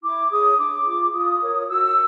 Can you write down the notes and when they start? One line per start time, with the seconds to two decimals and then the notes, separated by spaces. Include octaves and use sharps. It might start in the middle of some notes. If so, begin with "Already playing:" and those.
0.03 E4 D6
0.31 G#4 C#5 D#6
0.57 D4 D6
0.85 F4 G#4
1.13 F4 D#6
1.41 A#4 C#5
1.69 F#4 E6